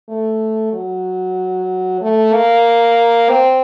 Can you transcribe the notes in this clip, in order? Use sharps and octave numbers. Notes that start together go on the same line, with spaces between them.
A3
F#3
A3
A#3
C4